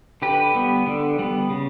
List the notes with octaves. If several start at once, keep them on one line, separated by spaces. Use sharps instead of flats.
D3 G4 B4
G3 B3
D3
G3 B3
C#3